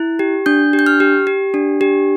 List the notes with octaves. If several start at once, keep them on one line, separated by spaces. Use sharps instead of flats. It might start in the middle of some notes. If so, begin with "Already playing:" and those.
Already playing: E4
G4
D4 G6
G4
G6
F6
G4
G4
D4
G4